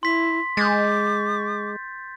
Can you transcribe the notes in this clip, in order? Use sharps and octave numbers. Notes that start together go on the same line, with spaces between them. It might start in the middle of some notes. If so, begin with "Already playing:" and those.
E4 C6 B6
G#3 D6 G6 A6